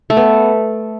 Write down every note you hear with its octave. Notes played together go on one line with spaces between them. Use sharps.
A3
B3